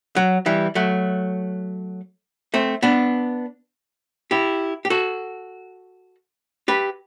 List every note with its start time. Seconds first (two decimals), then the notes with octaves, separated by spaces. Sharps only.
0.16 F#3
0.46 E3 G3
0.75 F#3 A3
2.54 A3 C4
2.83 B3 D4
4.31 E4 G4
4.85 G4
4.90 F#4 A4
6.68 G4 B4